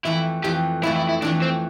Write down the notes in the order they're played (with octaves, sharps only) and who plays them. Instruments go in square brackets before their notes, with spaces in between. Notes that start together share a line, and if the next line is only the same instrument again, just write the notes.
[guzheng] F2 E3 A3 [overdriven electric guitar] E4
[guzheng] F2 E3 A3 [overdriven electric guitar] G4
[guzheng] F2 E3 A3 [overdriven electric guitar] E4
[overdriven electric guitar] E4
E4
[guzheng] F2 E3 A3 [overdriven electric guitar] D4
[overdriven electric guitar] C4